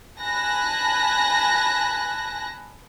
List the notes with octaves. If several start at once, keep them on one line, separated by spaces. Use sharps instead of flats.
G#5 A5 B5 F#6 A#6